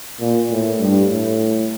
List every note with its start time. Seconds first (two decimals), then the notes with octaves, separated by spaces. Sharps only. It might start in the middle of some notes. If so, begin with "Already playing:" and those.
0.21 A#2
0.50 A2
0.79 G2
1.08 A2